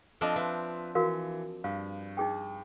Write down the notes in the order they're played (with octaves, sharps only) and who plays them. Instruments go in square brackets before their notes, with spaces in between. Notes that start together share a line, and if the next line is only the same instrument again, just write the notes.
[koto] F3 C4 D4 [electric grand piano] A4 D#5
[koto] C4 [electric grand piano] F4 B4 E5
[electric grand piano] E3 [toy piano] F#4 A#4 F5
[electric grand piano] G2 [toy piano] F5
[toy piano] D#4 G#4 G5